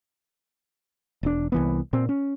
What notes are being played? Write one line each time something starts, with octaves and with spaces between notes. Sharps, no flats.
E1 D4
C2 E3 B3
A#2 C4
C#4